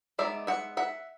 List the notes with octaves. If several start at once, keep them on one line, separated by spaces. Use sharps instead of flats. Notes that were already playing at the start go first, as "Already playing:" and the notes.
G#3 B3 D#4 D5 E5
E5 F#5
E5 F#5